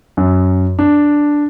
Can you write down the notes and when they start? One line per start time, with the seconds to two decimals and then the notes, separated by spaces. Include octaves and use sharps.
0.17 F#2
0.79 D4